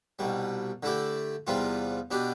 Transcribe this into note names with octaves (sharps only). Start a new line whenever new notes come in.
C2 B2 G3
D3 A3 E4 G4
E2 C3 G3 B3 F4
B2 B3 D4 G4